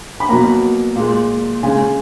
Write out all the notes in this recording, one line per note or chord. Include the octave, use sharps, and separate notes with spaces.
B5
B2 F#3 A#3 A#5
A#2 G#3
C#3 G#3 G#5